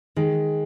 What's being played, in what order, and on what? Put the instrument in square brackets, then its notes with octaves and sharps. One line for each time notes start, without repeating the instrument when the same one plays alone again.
[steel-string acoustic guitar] D#3 [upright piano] G#3